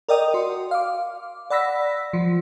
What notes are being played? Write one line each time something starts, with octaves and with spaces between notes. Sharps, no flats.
A#4 D5 D#5 G5 D#6
F#4 C6
F5 D6
D5 F#5 B5 E6 A#6 B6
F3